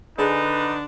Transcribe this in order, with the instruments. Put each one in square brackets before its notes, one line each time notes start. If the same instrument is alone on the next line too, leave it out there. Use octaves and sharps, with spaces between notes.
[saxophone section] D3 D4 [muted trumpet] D#4 [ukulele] G#4 C5 G#5 [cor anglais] B4